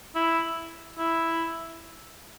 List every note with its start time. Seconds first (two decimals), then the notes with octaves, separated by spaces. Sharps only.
0.15 E4
0.98 E4